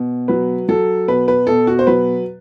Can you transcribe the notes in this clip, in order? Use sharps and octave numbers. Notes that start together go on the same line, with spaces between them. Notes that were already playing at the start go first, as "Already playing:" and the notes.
Already playing: B2
F#3 B4
F#3 A4
B2 B4
B4
B2 A4
F#4
C5
F#3 B4